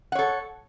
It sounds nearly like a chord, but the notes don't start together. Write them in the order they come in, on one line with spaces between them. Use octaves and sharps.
F#5 C#5 A4